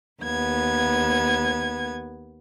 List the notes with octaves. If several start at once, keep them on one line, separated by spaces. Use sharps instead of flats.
D#2 B3 G#6